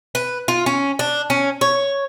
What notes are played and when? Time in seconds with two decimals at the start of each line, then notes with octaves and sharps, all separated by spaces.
0.15 B4
0.48 F4
0.66 C#4
0.99 D4
1.30 C#4
1.61 C#5